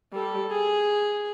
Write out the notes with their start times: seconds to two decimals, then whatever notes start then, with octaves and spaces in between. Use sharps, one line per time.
0.13 G3 A4
0.51 G#4